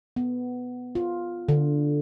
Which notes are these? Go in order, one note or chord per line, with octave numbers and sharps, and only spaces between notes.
B3
F4
D3